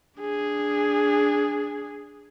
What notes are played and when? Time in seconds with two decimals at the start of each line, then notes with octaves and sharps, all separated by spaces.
0.21 D4 G#4